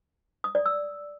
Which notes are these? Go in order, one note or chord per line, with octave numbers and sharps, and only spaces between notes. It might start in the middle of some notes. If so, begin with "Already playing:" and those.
D#6
D5
E6